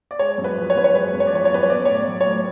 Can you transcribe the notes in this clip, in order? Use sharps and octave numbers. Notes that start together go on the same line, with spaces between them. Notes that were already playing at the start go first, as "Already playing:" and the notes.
D5
G#3 C#5
F#2
B4
F3
C#5
F#2 B4
C#5
G#3 B4
F#2
C#5
D5
F3 C#5
C#5
F#2 B4
C#5
B3 D5
A2 C#5
D5
F#3
C#5
A2